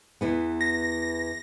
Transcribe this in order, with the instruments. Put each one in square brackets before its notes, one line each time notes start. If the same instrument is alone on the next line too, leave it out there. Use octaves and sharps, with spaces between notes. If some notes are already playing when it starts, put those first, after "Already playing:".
[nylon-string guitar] E2 E3 B3
[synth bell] A#6